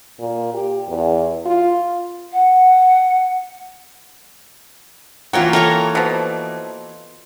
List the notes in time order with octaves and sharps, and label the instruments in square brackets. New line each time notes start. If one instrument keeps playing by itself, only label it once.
[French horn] A#2
G4
E2
F4
[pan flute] F#5
[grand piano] E3 A#3 G5 [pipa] F#3 [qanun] F4 A#4 C#5
[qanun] A4 C#5 A#5 [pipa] A#4
[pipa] B2 F3